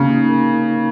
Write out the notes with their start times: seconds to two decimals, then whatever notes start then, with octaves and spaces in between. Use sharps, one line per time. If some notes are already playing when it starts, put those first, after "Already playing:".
Already playing: C#3 A#3
0.10 D#4
0.28 A#4